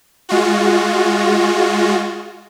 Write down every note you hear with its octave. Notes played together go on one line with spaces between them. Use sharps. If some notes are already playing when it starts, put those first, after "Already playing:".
G#3 F4 F#4